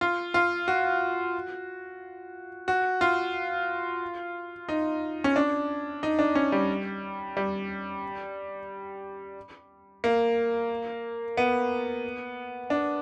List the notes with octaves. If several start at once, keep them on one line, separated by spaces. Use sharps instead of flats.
F4
F4
F#4
F#4
F4
D#4
C#4
D4
D#4
D4
C#4
G3
G3
A#3
B3
D4